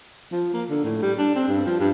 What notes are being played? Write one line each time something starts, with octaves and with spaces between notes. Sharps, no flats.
F3
A#3
D3
A2
G3
D4
C4
G2
F3
G2